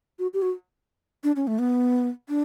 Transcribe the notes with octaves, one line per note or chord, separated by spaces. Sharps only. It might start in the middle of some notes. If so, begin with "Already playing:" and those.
F#4
G4
F#4
D4
C#4
A3
B3
D4